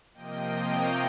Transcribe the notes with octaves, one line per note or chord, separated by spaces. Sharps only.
C3 F3 A#3 D#5 G5
C#5 F5